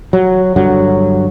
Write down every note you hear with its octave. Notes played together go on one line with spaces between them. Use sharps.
F#3
G2 D3 F#3